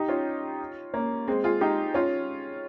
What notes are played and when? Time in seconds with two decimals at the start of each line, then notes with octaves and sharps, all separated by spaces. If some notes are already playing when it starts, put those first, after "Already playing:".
Already playing: D#4 G4
0.08 C#4 F4
0.93 A#3 C#4
1.27 G#3 C4
1.44 F4 G#4
1.61 D#4 G4
1.94 C#4 F4